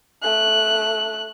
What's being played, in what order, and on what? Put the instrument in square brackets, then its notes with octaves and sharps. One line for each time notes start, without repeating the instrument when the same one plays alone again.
[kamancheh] A3 F#6